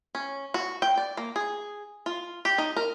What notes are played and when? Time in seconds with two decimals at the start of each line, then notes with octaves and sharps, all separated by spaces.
0.15 C#4
0.54 F#4
0.82 G5
0.97 D5
1.17 A#3
1.36 G#4
2.06 F4
2.45 G4
2.58 D#4
2.76 A#4